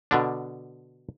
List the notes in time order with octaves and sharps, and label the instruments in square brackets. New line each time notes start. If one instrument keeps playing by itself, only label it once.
[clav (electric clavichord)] B2 D3 D4